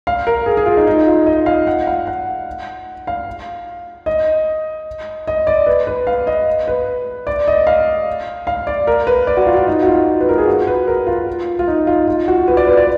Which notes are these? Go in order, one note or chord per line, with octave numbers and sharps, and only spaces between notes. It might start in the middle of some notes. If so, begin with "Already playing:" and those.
F5
A#4
G#4
G#4
F4
D#4
D#4
F4
D#5
F5
F#5
F5
F#5
F5
D#5
D#5
D5
B4
B4
F5
D#5
B4
D5
D#5
F5
F5
D5
A#4
B4
D5
F#4
F4
F4
D#4
F#4
F4
B4
A#4
G#4
F#4
B4
A#4
F4
F4
D#4
F4
F4
F#4
B4
D5
B4
D5